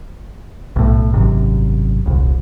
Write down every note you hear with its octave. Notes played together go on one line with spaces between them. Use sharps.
B1 A2
G#1 F#2 C3
D#1 C2